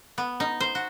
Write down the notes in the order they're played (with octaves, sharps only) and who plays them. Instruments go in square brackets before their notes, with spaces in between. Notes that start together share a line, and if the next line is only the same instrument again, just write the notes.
[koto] B3
D#4
C5
F#4